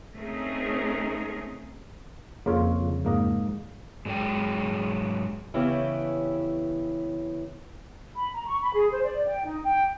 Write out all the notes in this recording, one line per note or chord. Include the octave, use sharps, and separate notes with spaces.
A3 C4 C#4 D#4 G#4 A#4
F2 C#3 A#3 F4 C#5
G#2 A#3 D#5
G#2 F#3 G#3 G5
C#3 E3 B3 C#4 E4 G4
B5
A#5
C#6
B5
G#4
C5
D5
G5
D#4
G5